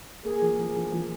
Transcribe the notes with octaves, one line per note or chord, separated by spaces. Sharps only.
A#3 G#4
F3
F3 G#4
F3
F3